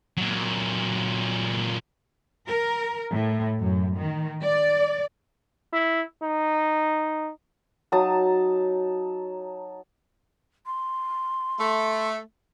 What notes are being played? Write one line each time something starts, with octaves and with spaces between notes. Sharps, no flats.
A#2 F#3
A#4
A2
F#2
D#3
D5
E4
D#4
F#3 D#4 A5 D#6
C6
A3